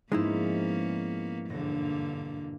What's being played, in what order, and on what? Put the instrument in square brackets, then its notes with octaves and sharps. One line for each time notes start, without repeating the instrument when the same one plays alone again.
[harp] G#2 F3 [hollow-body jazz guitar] G#3 D#4 E4 [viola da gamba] A#3 B3 C#4
[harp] E1 F#4 A#6 [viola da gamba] G2 D3 A#3